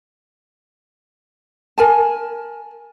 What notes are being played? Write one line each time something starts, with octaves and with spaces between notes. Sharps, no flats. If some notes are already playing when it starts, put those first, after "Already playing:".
A#4 G#5 A5